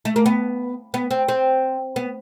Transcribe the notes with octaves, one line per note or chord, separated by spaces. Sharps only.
A3
A#3
B3
B3
C4
C4
B3